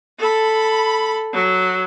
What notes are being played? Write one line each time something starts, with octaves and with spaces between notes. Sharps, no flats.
A4 B5
F#3